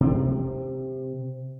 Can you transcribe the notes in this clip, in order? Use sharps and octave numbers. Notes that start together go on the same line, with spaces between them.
C3 C4